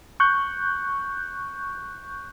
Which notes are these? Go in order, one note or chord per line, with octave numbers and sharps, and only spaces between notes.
C#6 F#6 G6